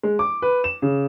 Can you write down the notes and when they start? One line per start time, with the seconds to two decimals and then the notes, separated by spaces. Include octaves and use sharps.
0.03 G#3
0.19 D6
0.42 B4
0.64 E7
0.82 C#3